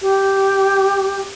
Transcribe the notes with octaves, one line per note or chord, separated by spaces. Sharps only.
G4